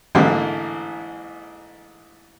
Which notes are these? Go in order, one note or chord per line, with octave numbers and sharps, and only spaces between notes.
A1 G#2 D3 A#3 E4 G5